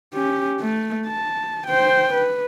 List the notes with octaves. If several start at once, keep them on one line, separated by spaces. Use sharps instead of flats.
C#4 G4
A3
A5
C5 G5
B4